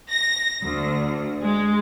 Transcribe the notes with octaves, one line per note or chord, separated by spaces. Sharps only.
A#6
D2
G#3